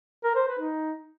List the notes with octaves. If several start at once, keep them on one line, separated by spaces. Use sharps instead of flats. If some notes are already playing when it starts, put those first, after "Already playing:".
A#4
C5
B4
D#4